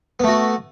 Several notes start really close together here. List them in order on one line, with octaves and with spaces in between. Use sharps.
B3 A3 F#4